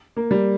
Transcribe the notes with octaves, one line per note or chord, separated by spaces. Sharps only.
A#3
G3